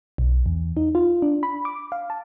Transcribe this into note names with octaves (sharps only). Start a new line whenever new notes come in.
B1
E2
D#4
F4
D4
B5
D6
F5
A5